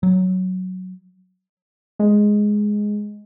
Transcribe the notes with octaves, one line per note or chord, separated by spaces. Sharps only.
F#3
G#3